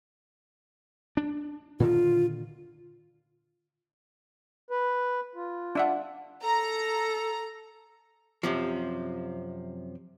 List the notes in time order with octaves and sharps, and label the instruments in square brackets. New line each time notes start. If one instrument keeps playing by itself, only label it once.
[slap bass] D4
[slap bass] A#2 D3 D#3 [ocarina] F4
[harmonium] B4
F4
[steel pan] D4 E5 F#5
[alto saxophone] A4 [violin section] A#5
[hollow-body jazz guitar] F#2 C3 F3